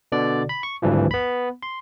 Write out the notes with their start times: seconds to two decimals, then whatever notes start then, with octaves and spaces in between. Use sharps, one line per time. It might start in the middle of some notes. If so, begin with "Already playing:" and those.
0.12 B2 D3 D5
0.49 B5
0.63 C#6
0.82 G#1 D2 G2 E3 F3
1.11 B3 B5
1.63 C6